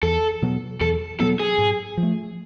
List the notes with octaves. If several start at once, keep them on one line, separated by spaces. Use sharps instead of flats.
E2 A4
B2 F#3 B3
E2 A4
B2 F#3 B3 A4
G#4
G#2
F3
A3